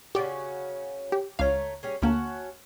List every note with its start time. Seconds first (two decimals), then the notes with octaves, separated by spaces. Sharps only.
0.15 C#3 C#4 F#4 G4 D5
1.12 G4
1.39 C#2 A3 C#5 F5 A#5
1.83 G3 C#4 G#4
2.02 D2 A#3 C#4 F#4 A5